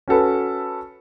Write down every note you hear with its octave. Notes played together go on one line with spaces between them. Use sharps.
C#4 F#4 A4 B4